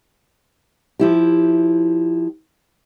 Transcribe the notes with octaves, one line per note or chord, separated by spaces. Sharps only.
F3 E4 G4